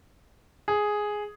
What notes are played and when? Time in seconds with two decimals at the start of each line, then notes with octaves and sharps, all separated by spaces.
0.68 G#4